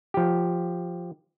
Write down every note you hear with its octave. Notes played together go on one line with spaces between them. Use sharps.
F3 G4